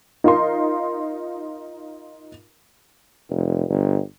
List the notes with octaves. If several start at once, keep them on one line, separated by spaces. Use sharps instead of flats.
D#4 F4 A#4 C6
F1
G1